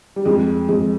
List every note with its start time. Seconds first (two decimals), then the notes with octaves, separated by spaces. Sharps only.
0.16 G3
0.25 F2 G#3
0.69 F2 G#3